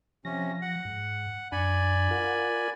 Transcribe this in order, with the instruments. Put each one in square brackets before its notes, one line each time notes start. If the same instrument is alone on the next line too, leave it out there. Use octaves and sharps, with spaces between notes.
[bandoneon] C3 C#4 [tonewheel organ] F3 A#6
[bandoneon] F#5
[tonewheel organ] G#2
[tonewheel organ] F#2 D4 [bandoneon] D5 G#5 B5
[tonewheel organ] F4 A#4 F#5